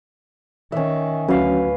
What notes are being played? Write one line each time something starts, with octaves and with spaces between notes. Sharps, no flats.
D#3 C#4 E5
D2 F#3 C#4 F#4 B4 F5